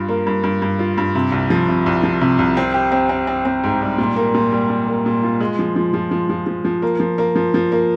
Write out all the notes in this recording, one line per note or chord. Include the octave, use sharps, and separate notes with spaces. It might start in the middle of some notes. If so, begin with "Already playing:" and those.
Already playing: G2 F4
A#3
G2
G2
G2
F4
G2
C3
C2
F3
C3
C2
F3
C3
C2
C4
G4
C4
C4
C4
C4
G#2
G3
A#2
A#3
A#2
G3
A#2
A#3
A#2
F4
G#3
F3
F3
F3
F3
F3
F3
F3
A#3
F3
A#3
F3
F3
A#3